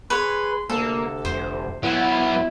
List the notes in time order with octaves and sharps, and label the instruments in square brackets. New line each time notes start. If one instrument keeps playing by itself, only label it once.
[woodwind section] G#4 C6 [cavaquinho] B4 C#5
[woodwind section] D2 C3 [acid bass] A#3 [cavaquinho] A4
[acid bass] F1 [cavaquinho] C5
[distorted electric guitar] F#3 B3 [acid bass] E4